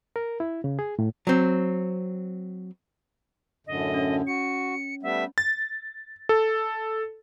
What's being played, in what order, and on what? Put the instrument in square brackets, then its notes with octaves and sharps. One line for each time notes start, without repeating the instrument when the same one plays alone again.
[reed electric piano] A#4
E4
C#3
G#4
A2
[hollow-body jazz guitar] F#3 C4
[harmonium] F#2 A2 D3 [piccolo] D#5
[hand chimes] C#4
[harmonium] F#4 [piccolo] C#7
[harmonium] G3 A3 B3 [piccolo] E5
[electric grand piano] A6
A4